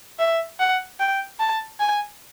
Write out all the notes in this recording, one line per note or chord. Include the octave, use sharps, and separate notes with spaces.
E5
F#5
G5
A5
G#5